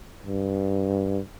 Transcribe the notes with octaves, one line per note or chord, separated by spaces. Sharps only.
G2